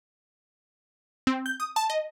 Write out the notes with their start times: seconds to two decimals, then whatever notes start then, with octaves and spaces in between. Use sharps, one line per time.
1.27 C4
1.46 G6
1.60 D#6
1.76 A5
1.90 D#5